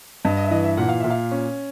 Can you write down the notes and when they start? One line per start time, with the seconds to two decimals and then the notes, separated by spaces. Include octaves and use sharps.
0.25 G2 D#5
0.37 D#5
0.44 E5
0.50 E3 D#5
0.64 E5
0.77 A#2 F#5
0.89 F5
1.00 A#2 E5
1.10 F5
1.31 C#4